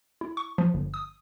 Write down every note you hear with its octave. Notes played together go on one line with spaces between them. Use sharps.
E4
C#6
F3
G1
D#6